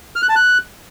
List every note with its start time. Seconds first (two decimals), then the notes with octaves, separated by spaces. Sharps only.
0.15 F6
0.22 F#6
0.29 A5
0.36 F#6